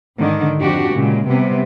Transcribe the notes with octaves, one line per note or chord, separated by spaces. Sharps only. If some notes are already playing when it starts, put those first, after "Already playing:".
G#2 D3 D#3
F2 F3 D4 F#4 G4
A#2 C#3 G#3
C3 G3 B3